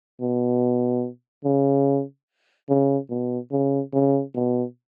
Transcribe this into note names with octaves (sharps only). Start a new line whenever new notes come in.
B2
C#3
C#3
B2
C#3
C#3
B2